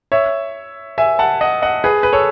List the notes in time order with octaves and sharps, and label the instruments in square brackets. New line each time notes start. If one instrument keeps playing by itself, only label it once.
[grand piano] C#5 E5
E5 G#5
F#5 A5
D#5 F#5
D#5 F#5
G#4 B4
B4
A4 C#5